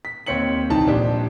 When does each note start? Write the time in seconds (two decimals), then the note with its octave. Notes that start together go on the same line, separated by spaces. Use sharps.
0.05 B6
0.26 D#2 C4 C#5 C#7 F#7
0.69 D#1 C2 E3 D#4 A5
0.87 A#1 D4 G4